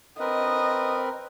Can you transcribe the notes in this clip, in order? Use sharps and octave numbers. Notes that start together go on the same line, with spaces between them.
C4 A#4 B4 D#5